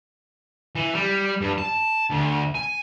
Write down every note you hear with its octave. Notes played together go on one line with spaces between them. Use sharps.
E3
G3
G2
A5
D2
G#5